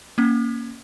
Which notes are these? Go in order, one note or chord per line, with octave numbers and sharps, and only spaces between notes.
A#3 C#4